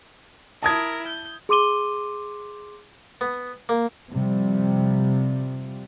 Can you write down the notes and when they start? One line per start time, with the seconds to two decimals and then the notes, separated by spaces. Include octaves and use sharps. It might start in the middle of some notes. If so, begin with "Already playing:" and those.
0.63 E4 A#4 A5 D#6 G#6
1.07 G6
1.49 G#4 C6 D6 D#7 G7
3.21 B3
3.69 A#3
4.10 C3 F3 G3